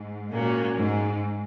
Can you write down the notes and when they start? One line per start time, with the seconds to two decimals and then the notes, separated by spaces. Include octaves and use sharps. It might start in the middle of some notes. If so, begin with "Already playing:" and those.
Already playing: G#2
0.31 A#2 A#3 C#4 F#4
0.77 G#2